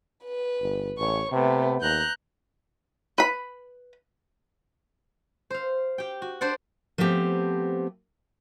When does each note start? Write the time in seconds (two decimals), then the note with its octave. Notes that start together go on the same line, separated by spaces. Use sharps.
0.24 B4
0.61 G1
0.97 A1 C#5 C#6
1.32 C3 A3 B3
1.81 D#2 A#5 F#6 G6
3.18 B4 B5
5.50 C5 F5
5.98 G4 G5
6.22 F#4
6.41 D4 C5 D5 F#5
6.98 F3 A3 B3 C4 G4